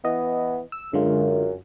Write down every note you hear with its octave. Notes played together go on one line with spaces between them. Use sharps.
E3 B3 D#5
E6
F#2 D3 G#3 F4